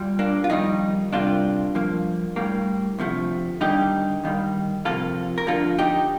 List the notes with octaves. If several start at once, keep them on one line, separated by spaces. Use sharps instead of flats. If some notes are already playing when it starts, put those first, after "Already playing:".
Already playing: A#2 G3
A#3 D4
F4
F2 D#3 G3 A#3 C4 D#4
C2 C3 G3 A#3 D4 F4
G2 F3 A#3
A2 G3 A#3
D2 C3 F3 A3
D#2 D3 G3 A#3 D#4 G4
D#2 D#3 G3 A#3
F2 C3 F3 A#3 F4 A4
A#4
D2 D3 F3 A#3 F4 A4
D#4 G4